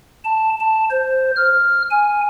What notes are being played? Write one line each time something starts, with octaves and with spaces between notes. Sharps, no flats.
A5
A5
C5
F6
G#5